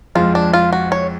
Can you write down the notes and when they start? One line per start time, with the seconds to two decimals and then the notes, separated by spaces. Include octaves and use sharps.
0.15 F2 F3 G#3 F4
0.35 D4
0.53 F4
0.73 F#4
0.92 C#5